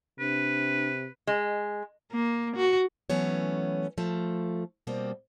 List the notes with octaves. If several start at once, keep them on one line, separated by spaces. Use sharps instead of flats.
C3 D4 B4
G#3
A#3
F#4
E3 F#3 A3 B3 C#4 C#5
F3 A3
B2 G3 A#3 C4